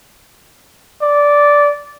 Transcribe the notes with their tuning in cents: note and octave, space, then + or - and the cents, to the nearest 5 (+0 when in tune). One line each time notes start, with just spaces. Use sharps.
D5 -10